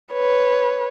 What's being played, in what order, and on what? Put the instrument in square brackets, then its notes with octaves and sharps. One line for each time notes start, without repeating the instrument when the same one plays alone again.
[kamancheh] B4 C#5